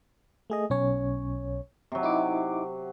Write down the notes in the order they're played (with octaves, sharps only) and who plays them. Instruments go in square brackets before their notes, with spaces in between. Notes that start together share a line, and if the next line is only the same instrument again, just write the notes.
[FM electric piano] A3 G#4 D#5
B1 C#4 C#5
[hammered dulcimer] C3 F#3
[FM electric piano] D#4 E4 D6